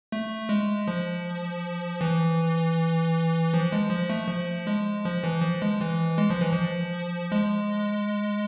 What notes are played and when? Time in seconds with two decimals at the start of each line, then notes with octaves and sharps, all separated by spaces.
0.12 A3
0.49 G#3
0.88 F3
2.01 E3
3.54 F3
3.72 G#3
3.90 F3
4.10 A3
4.28 F3
4.67 G#3
5.05 F3
5.24 E3
5.42 F3
5.62 G#3
5.81 E3
6.18 G#3
6.30 F3
6.41 E3
6.52 F3
7.32 G#3